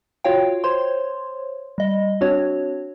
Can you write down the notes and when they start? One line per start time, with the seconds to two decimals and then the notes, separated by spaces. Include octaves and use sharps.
0.24 F4 F#4 C#5 F5 G5
0.64 C5 C#5 C6
1.78 G3 D#5
2.21 C4 D4 F#4 C#5